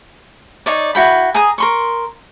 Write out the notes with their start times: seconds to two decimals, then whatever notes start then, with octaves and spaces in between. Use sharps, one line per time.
0.66 D#4 C#5 D5
0.95 E4 F#4 G5 B5
1.34 G#4 G#5 A#5 D#6
1.58 A#4 C6 C#6